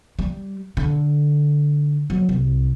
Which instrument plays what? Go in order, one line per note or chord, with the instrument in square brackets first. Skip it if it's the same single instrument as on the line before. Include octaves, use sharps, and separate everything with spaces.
[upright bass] G3
D3
F#3
C2